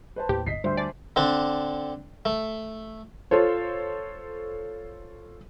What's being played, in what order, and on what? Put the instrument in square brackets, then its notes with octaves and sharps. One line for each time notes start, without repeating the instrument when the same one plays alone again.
[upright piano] B4 C5 A5
[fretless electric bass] D#2 A2 [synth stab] G4
[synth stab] G1 [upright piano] D#5 B6 C7
[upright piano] D2 [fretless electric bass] G3 [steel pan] C5 E5 C6
[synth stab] D5 [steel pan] G#5 A5 C6
[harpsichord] D3 C4 D4
A3
[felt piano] F4 A4 C5 C#5